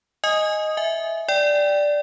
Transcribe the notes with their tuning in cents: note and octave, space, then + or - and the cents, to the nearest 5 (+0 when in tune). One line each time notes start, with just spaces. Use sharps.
D#5 +0 G#5 +0 D#6 +0
E5 +0 G#5 +0
D5 +0 G5 +0